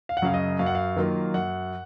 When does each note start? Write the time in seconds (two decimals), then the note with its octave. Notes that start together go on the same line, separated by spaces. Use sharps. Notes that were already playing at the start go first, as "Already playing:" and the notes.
0.09 F5
0.17 F#5
0.22 F#2 C#3 F#3 F5
0.34 D#5
0.59 F#2 F5
0.66 F#5
0.75 F5
0.96 D#3 F#3 A#3 F4
1.34 F#2 F#5